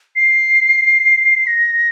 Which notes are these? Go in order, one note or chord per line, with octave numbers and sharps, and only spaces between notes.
C7
A#6